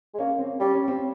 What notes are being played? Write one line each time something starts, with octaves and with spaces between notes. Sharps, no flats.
G#3
A#3 C#4
C4
G3 C#4
C#4
C4